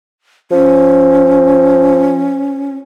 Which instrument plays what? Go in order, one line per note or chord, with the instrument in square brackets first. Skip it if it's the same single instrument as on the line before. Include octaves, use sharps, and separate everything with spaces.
[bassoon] F3 [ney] C#4